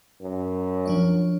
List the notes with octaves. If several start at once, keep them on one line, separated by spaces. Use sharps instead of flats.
F#2
F3 D4 C#5